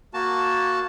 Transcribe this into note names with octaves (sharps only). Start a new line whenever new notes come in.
A#3 F#4 A5